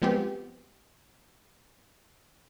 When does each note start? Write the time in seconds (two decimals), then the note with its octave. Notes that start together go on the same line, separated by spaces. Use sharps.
0.02 F3 G#3 B3 C4 G4